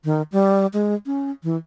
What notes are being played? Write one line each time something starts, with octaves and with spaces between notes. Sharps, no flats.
D#3
G3
G#3
C#4
E3